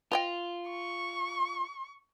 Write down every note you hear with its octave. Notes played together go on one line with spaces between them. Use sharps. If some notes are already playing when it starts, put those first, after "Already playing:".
F4 B4 D#5 G5
C#6